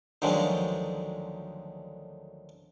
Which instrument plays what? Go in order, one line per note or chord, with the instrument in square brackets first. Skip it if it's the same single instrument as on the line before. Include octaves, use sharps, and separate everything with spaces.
[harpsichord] D2 D3 D#3 F3 F#3 G#3